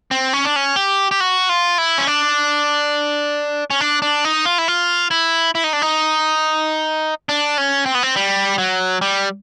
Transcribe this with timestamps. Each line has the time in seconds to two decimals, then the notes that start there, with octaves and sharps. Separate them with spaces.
0.11 C4
0.33 C#4
0.45 D4
0.56 C#4
0.76 G4
1.11 G4
1.20 F#4
1.49 F4
1.78 E4
1.98 C#4
2.07 D4
3.71 C#4
3.81 D4
4.02 D4
4.25 D#4
4.45 F4
4.58 E4
4.68 F4
5.11 E4
5.55 E4
5.64 D#4
5.73 D4
5.82 D#4
7.29 D4
7.58 C#4
7.86 C4
7.95 B3
8.03 C4
8.16 G3
8.58 F#3
9.02 G3